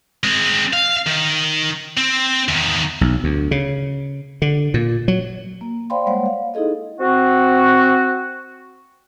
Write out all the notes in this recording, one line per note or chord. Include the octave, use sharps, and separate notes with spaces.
G#3 C4
F5
D#3
C4
E2 D#3
B1
D2
C#3
D3
A#2
F#3
A#3
C5 D5 F5 G5 B5 C6
G3 G#3 A#3 C5 C#5 F#5
F5
D#4 E4 G#4 A4 D#5
C4 F#4